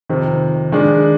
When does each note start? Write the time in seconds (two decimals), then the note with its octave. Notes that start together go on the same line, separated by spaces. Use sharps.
0.09 F2 C3 D#3
0.72 D#3 G#3 D4